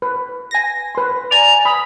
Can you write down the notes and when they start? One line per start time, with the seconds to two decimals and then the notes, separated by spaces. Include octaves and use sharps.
0.02 B4
0.51 G#5 A#6
0.95 B4 C6
1.31 D5 G#5 A#5 F7
1.65 B5 D#6